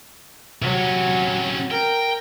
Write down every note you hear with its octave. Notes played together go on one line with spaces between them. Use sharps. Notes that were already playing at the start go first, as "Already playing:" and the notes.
C3 F#3 C#4
A#4 G5